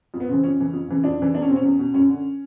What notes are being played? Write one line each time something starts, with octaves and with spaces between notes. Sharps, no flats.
F2
B3
C#3 E3 C4
F2 C#4
C#3 E3
F2
C#3 E3
F2 D4
C#3 E3
E2 D4
C#4
B2 C4
C#4
E2
B2
F#2 C#4
D3